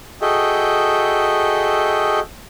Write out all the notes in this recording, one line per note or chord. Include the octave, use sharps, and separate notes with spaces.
F#4 G#4 A4 D#5 E5 G5